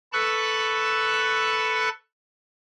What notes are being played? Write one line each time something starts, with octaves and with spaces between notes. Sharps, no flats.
A4 B4 C#6 E6 F#6